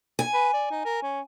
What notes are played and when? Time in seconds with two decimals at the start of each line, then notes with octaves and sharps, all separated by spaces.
0.19 G#5
0.34 B4
0.53 D5
0.71 D#4
0.85 A#4
1.02 C#4